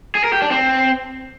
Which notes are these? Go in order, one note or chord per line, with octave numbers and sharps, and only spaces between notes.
G#4
A#4
G4
D4
C4